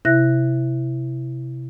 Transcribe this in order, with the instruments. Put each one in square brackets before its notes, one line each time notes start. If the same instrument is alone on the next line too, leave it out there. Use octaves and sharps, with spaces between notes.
[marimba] C3 E4 E5 F#6 A#6